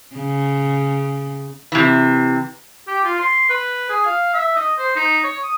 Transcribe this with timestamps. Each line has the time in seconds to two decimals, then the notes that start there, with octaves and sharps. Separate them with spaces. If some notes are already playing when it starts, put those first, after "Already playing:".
0.16 C#3
1.72 C3 E3
2.88 G4
3.04 F4
3.19 C6
3.50 B4
3.90 G#4
4.05 F5
4.33 E5
4.56 D#5
4.78 C5
4.96 D#4
5.24 C#5
5.43 D#6